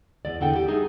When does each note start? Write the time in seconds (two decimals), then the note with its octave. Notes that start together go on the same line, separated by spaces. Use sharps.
0.25 E2 D5
0.41 E2 D3 F#5 G5
0.56 G4
0.68 G3 A3 D#4 G#4